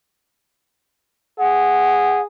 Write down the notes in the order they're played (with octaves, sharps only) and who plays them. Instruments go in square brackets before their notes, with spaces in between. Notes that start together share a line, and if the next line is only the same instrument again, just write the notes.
[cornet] G#4 [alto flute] F#5